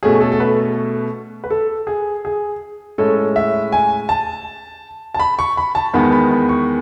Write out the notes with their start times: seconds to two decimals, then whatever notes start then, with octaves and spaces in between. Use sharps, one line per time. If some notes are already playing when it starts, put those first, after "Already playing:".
0.03 B2 A3 C#4 G#4
0.21 A4
0.32 A4
0.40 B4
1.44 B4
1.50 A4
1.87 G#4
2.25 G#4
2.98 A2 G#3 C#4 A4
3.36 E5
3.72 G#5
4.09 A5
5.14 A5
5.20 B5
5.39 C#6
5.57 B5
5.75 A5
5.94 E2 D#3 G#3 B3 B5
6.12 B5
6.31 B5
6.49 C#6